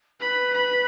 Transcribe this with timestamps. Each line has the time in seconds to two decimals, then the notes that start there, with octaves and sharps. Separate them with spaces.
0.20 B4 B5
0.54 B5